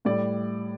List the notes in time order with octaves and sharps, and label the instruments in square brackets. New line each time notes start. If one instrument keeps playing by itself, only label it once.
[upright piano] A2 G3 D5